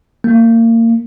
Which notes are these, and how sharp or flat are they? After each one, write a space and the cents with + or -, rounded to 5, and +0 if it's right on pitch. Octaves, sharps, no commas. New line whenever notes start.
A#3 -30